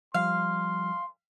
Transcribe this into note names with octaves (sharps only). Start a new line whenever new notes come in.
F3 G3 F5 C6